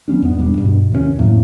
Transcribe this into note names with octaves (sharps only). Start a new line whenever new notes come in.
F#3 B3 C#4 D4
E2 G#2 B3
E1 G3 B3 D4
G2 B2
D#2 C3 A#3 C#4
F2 A2 F#3 A#3